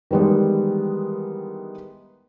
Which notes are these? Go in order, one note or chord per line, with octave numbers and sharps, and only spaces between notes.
D#3 E3 G3 G#3 B3